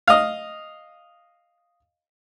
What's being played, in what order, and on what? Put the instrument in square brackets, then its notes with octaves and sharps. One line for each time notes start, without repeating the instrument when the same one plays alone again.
[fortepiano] D#5 F5